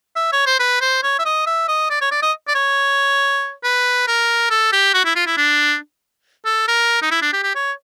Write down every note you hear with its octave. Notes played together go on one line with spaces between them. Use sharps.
E5
C#5
C5
B4
C5
C#5
E5
D#5
E5
D#5
D5
C#5
D5
D#5
D5
C#5
B4
A#4
A4
G4
F#4
E4
F4
E4
D4
A4
A#4
D#4
E4
D4
G4
G4
C#5